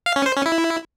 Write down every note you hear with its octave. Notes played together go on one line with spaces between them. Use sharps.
F5
C#4
C5
C#4
E4